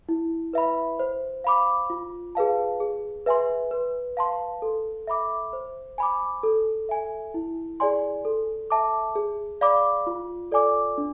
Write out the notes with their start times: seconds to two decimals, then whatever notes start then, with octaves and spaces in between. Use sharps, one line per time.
0.09 E4
0.53 B4 E5 B5
0.99 C5
1.44 F5 B5 D6
1.90 F4
2.35 G#4 B4 F5 A5
2.80 G#4
3.26 B4 E5 G#5 C6
3.71 B4
4.17 F5 A5 C6
4.62 A4
5.07 E5 B5 D6
5.53 C5
5.98 G#5 B5 D6
6.43 A4
6.89 E5 G#5
7.34 E4
7.80 G#4 D5 G#5 C6
8.25 A4
8.70 E5 A5 D6
9.16 G#4
9.61 D5 F5 B5 D6
10.07 F4
10.52 A4 D5 G#5 D6
10.98 D4